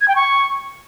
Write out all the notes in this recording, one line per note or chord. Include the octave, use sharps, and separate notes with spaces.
G#6
G5
C#6